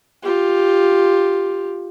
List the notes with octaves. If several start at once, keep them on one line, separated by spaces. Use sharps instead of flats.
F4 G4